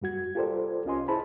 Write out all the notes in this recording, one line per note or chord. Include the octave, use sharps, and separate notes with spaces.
F#2 G3 F#4 G#6
F4 G4 A4 A#4 C5 D5
C2 C#4 F4 D#5 G#5 C6
E4 G#4 C5 A5 B5